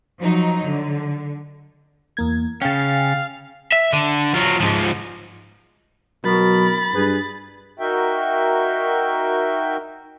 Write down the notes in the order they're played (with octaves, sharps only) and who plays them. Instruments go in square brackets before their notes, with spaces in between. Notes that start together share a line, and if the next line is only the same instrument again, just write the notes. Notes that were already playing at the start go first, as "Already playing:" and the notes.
[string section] F3 F#3 D#4
D3
[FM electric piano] E2 A#3 G#6
[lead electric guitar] C#3 C#4 [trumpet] F5 [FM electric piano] G5 G#5 A6
[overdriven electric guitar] E5
D3
F#3 F4
G#2 F3
[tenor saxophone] B2 [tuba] F#3 [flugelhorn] A#4 [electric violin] B5 A6
[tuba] G2 [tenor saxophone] G#4 [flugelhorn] B4
[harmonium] D#4 F#4 A#4 E5 G5